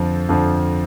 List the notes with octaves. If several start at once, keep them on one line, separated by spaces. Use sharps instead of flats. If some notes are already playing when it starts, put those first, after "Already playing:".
Already playing: F2 D3 F3
F2 D3 F3